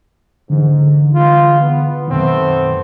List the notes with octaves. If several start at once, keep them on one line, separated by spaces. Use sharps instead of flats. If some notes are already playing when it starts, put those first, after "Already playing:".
G#2 D3 E3
G#3 F4
B3
F#2 B2 D#3 A3 B3 C4